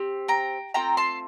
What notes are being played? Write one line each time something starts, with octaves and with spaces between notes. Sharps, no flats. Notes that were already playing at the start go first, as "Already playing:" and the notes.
Already playing: C4 G4
G5 A#5
A3 C4 F4 G5 A#5
A5 C6